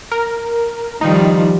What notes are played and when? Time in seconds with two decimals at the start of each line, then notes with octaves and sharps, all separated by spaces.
0.12 A#4
1.01 D#3 F3 G3 D#4